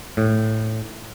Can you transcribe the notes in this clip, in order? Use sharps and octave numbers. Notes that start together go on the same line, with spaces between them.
A2